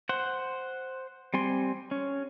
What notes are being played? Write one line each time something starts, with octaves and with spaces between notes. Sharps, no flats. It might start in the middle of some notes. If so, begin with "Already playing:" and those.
C5 F#5
G3 C4 G#5 C6
C#4